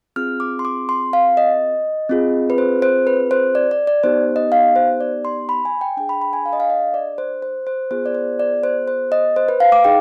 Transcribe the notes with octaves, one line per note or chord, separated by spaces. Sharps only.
C4 F4 G#4 F6
D6
C6
D6
C6
F5
D#5
C4 F4 G#4
B4
C5
C5
B4
C5
D5
D5
D5
B3 D#4 G4 C5
D#5
F5
C5
D5
C6
B5
G#5
G5
D4 G#4 G5
B5
B5
G#5
F5
D#5
F5
D#5
D5
C5
C5
C5
B3 F4 G#4 C5
D5
C5
D5
C5
C5
D#5
C5
B4
F5
D6
D#4 G#4 G5